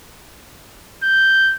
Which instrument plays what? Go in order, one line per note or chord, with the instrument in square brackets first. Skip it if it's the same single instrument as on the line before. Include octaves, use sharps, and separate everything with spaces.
[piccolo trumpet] G6